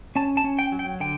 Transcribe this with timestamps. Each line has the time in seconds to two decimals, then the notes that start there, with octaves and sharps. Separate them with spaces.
0.16 C#4 A5
0.37 A5
0.44 C#4
0.59 G5
0.72 F#3
0.79 G5
1.00 D3 G5